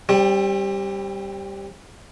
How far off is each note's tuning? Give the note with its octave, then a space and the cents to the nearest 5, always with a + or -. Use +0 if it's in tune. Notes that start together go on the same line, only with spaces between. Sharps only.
G3 +0 C4 +35